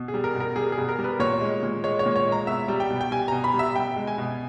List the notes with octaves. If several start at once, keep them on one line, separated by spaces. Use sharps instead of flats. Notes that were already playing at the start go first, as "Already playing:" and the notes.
Already playing: B2
G#4
G3
A#4
B2
A#4
G3 G#4
G#4
B2
A#4
G3
B4
A#2 C#5
G#3
A#2
G#3 C#5
C#5
A#2
C#5
G#3
A#5
B2 E5
G3
G5
B2
G5
G3 G#5
B2 A#5
B5
G3
E5
B2 G5
G#3
G#5
B2